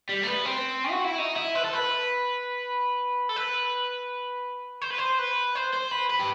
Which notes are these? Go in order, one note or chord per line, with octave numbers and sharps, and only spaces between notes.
G3
A3
B3
C4
F#4
E4
D#4
E4
B4
A4
B4
A4
B4
C5
B4
C5
B4
C5
C5
B4
B4
G4